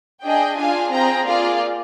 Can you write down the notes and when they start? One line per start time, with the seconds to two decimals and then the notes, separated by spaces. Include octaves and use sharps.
0.24 D4 G#4 D#5 G5
0.57 D4 F4 G#4 F5 G#5
0.92 C4 F4 G#4 G5 A#5
1.26 A#3 F4 G#4 D5 F5